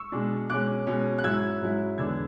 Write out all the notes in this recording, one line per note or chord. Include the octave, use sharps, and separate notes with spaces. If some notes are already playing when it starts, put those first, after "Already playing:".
Already playing: C#6 E6
B2 G#3 D4
B2 G#3 C#4 D6 F#6
B2 G#3 C#4
F#6
G#2 F#3 C#4 E4 E6 G#6
G#2 F#3 C#4 E4
E2 D3 G#3 B3 D4 E6 G#6